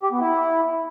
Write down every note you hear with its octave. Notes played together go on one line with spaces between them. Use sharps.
G4
B3
E4